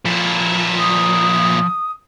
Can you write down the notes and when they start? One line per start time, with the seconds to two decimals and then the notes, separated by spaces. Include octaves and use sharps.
0.05 A#2 F3 E4
0.79 D#6